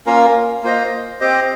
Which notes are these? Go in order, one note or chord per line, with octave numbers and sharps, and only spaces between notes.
A#3 C#4 F4 A#4
A#3 F4 C5 D#5
C4 G4 C5 D#5